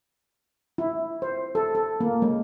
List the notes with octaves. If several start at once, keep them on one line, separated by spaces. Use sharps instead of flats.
E4
C5
A4
A4
A#3
G#3